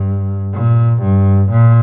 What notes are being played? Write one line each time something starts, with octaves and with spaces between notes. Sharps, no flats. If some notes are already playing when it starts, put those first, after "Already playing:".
Already playing: G2
A#2
G2
A#2